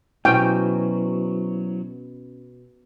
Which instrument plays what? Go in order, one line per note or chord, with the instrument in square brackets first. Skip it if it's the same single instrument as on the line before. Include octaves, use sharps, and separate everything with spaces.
[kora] B2 C#4 [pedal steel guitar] F#3 [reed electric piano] E4 B4 C5 [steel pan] G5